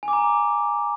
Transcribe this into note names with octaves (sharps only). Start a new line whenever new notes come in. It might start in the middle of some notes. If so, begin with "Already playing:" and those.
G#5
D6
A#5